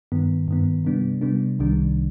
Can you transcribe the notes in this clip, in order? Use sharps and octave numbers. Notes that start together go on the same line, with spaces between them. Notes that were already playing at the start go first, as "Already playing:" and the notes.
G2 D#3 B3
G2 D#3 B3
C3 G3 B3 D4
C3 G3 B3 D4
C2 C3 D#3 G3 D4